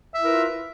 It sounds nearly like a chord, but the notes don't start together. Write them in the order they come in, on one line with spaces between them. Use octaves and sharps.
E5 E4 A#4 B4 F4